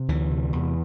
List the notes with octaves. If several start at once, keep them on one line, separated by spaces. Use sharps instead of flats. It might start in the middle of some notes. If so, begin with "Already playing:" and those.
Already playing: C3
D2 E3
C3
E2